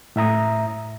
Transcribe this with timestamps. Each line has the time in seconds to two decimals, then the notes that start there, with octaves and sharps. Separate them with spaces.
0.16 A2 E5 A#5 D#6